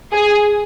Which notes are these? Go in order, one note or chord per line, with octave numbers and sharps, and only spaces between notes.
G#4